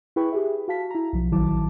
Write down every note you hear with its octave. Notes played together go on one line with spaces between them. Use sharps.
E4 G#4 B4 G5 B5 C#6
G4 G#4 E5
F#4 F5 A5 B6
E4 A#5
B1 F3
A1 D#3 F#3 E4 A5 D6